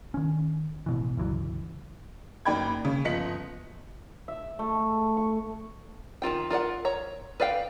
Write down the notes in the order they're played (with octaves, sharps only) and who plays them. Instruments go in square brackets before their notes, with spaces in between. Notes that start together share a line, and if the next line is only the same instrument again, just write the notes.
[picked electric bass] D#3 C#4
A1 B2 E3
G1 C#2 E3 F#3
[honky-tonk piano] F#1 D#4 D5 G5 B5 G#6
C#3
G1 F3 D#5 B6 C#7 F#7
[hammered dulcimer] E5
A3
C#6
[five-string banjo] D#3 E3 F4 G5
F4 A#4 D5 F#5
C#5 A#5
B4 D5 F5 G5